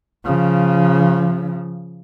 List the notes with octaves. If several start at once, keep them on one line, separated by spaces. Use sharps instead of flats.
C#3 F3